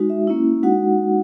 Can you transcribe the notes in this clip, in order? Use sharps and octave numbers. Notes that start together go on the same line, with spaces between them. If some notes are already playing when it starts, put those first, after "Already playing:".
Already playing: G#3 D#4 F#4
E5
A#3 C#4 E4
G#3 D#4 F#4 F#5